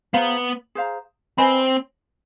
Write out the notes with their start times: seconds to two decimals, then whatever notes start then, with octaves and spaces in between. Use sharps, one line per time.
0.13 B3 G#4 C5 F5 A#5
0.75 G#4 C5 F5 A#5
1.38 C4 B4 D#5 G#5 B5